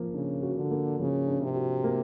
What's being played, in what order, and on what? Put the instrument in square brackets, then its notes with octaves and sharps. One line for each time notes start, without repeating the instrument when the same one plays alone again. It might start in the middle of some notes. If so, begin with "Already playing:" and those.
Already playing: [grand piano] F3 A#3
[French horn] C#3 [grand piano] D4
[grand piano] F#4
[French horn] D3
[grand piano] A#3
[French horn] C#3 [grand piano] F3
[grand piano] D4
[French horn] C3
[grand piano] F#4
A#3